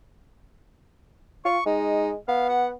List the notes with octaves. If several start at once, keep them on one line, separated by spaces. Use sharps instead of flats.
F4 C#6
G#3 D#4
B3 F5
F#5